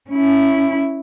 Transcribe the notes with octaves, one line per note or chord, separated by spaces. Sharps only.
C#4 E4